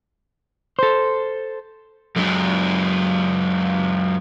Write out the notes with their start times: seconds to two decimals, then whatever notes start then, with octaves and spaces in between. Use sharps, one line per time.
0.79 A4 C5
2.16 F#2 G#3